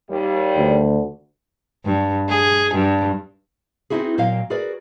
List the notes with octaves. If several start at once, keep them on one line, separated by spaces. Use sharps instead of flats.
D#2 G3
D2
G2
G#4
G2
B3 C4 D#4 E4 F#4 G#4
A#2 F#3 A#3 D#5 F5 G5
F#4 G#4 A#4 B4 D5